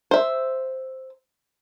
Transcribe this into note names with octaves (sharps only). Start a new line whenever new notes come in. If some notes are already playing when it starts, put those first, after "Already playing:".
C5 E5